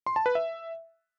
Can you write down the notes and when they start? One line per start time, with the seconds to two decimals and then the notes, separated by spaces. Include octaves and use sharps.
0.06 C6
0.16 A5
0.26 B4
0.35 E5